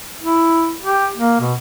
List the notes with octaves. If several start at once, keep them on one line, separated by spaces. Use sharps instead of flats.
E4
G4
A#3
B2